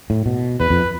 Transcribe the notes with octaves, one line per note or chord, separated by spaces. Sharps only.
A2
B2
E2 B4
F2